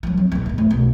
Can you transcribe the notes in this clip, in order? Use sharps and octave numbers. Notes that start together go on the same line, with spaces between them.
F3 F#3
C4
A#1 E2
D#1 G#1
A3
B1